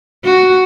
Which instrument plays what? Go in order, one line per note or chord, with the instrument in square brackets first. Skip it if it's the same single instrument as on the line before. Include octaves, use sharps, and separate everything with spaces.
[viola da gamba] F#4